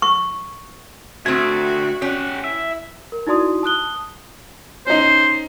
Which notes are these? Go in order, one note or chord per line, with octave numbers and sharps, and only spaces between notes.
C#6
D2 A3 C4 F#4 G#6
C#4 G4 F#5
E4 E5
A#4
D#4 E4 F#4 D5 C6 D#6
A5 D#6 F#6 G7
C#4 D#4 C5